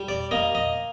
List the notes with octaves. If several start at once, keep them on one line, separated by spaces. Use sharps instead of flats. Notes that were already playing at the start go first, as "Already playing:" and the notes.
Already playing: G3
D5
A#3 D#5
D#5